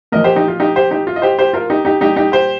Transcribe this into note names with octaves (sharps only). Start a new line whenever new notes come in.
A#2 F3 A#4 D#5
G4 C5
D#4 G4
F4
D#4 G4
G4 C5
D#4 G4
F4
D#5
G4 C5
G4 C5
F4 A#4
D#4 G4
D#4 G4
A#2 G3 D#4 G4
D#4 G4
G4 C5